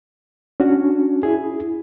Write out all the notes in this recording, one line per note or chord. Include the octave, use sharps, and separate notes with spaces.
C#4 D4 F#4
E4 G#4